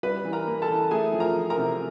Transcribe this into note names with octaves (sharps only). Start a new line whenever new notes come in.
G3 B4 B5
E3
A#4 A#5
A#3
A4 A5
E3
A3 G#4 G#5
F3
A#4 A#5
F3
A#4 A#5
C3